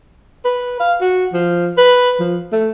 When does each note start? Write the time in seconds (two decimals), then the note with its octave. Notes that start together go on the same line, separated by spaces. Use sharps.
0.45 B4
0.80 F5
1.01 F#4
1.33 F3
1.77 B4
2.20 F3
2.52 A3